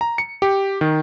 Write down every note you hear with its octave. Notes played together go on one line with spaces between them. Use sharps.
A#5
C#7
G4
D#3